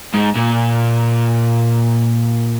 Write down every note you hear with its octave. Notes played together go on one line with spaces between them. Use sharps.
G#2
A#2